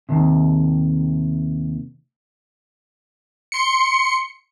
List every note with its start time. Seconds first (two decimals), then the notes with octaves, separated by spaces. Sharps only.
0.09 D#2 C3
3.52 C6 C#7